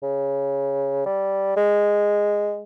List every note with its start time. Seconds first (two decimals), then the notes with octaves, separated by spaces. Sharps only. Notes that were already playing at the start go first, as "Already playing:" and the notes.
0.03 C#3
1.06 G3
1.57 G#3